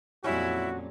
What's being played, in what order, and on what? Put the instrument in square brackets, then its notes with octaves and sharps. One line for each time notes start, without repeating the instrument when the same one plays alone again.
[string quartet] F2 A#2 F#3 [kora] G3 C#4 [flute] E4 [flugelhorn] F#4